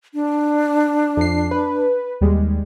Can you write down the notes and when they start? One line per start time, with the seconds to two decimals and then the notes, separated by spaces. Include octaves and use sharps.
0.14 D4
1.17 F2 C7
1.51 B4
2.21 D#2 G3 G#3